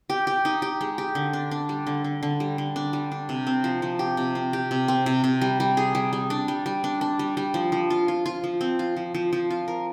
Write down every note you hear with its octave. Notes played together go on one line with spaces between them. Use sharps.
G4
G4
D#4
G4
G#3
G4
D3
D4
D4
G3
D3
D3
D3
G3
D3
D4
G3
D4
C3
C4
F3
F3
G4
C3
C4
G4
C3
C4
C3
C3
G3
G3
G#4
G3
G3
D4
G3
G3
D4
D4
G3
G3
F3
F3
F4
F4
F4
F3
C4
F4
F3
F3
F3
F4
A#4